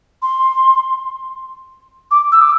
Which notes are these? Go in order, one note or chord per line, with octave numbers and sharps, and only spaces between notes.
C6
D6
E6
D6